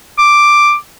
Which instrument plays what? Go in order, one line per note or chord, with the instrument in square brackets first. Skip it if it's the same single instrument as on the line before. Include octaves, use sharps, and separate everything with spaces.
[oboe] D6